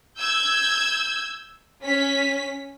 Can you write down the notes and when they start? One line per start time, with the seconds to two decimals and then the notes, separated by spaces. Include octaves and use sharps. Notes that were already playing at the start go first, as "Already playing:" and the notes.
0.20 E6 G6 G#6
1.84 C#4 B6